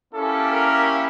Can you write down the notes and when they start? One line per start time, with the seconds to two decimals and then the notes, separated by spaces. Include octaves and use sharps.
0.12 A#3 C#4 E4 G4 A4
0.49 A#4